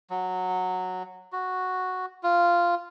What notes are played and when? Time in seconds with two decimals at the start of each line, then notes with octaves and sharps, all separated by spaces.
0.10 F#3
1.33 F#4
2.23 F4